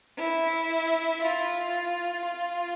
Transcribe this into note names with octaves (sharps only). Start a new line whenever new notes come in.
E4
F4
F4